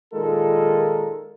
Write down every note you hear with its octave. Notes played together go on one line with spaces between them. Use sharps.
A#2 D#3 G#3 F4 A4 A#4